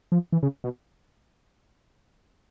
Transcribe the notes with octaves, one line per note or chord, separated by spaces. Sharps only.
F3
E3
C#3
B2